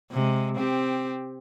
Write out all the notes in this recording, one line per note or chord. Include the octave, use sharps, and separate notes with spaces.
C3 G#3
C4 G4